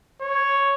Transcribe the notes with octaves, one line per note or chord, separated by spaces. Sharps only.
C#5